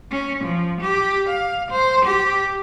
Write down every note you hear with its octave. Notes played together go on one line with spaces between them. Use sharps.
C#4
F3
G4
F5
C5
G4